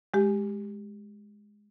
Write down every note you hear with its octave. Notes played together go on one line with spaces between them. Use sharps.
G#3 G4